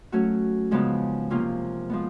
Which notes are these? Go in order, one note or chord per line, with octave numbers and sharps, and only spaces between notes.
F#3 A3 C#4 F#4
C#3 F3 G#3 B3 D#4
C3 F3 A#3 C#4 F4
F3 G#3 B3